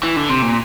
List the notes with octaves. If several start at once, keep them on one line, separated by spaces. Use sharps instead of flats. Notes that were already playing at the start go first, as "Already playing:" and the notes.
E3
D3
C3
A#2